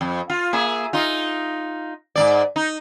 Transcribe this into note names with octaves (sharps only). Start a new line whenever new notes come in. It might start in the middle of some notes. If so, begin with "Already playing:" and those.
F2
F4
A#3 G#4 E5
D#4 F4
G#2 A3 D5
D#4